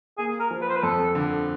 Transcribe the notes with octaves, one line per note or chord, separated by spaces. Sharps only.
A#3 G#4
A#4
F3
B4
C5
B4
F2 A4
D3